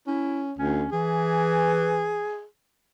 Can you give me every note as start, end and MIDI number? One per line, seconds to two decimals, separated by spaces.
0.07 0.52 61
0.07 0.44 64
0.59 0.84 38
0.59 0.88 61
0.92 2.27 52
0.92 2.45 68